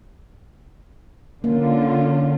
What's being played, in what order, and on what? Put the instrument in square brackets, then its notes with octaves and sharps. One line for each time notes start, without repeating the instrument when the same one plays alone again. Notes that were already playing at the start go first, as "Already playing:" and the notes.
[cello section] D3 F4 [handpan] A#3 [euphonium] C#4